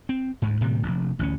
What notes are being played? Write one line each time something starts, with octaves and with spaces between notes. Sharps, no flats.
C4
D2 G#2
A2 C3 D#3 G3
F1 A#1
A1 D2 C#4